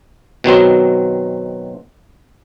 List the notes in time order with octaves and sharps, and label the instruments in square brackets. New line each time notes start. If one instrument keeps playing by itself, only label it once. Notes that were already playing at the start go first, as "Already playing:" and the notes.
[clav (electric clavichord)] B2 D#3 F#3 C4